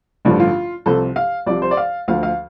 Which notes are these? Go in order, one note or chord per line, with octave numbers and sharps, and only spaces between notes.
A1 G2 D3 F3 D4
F4
C2 C3 F3 A4
F5
C2 C3 F3 D5
C5
D5
F5
D2 D3 F3 F5
F5